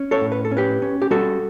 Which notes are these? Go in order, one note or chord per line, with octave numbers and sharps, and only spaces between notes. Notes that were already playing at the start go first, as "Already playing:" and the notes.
Already playing: C#4
A4 C#5
A2
B4
A4
C#4
G4 B4
C#4
G4
G3 F#4 A4